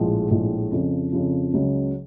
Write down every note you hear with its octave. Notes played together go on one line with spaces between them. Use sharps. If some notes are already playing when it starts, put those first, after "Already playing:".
Already playing: A#1 A2 F3 G#3
A#1 A2 F3 G#3
F2 C#3 F3
F2 C#3 F3
C#2 C#3 F#3